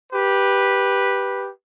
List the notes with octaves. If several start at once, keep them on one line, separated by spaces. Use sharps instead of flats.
G4 B4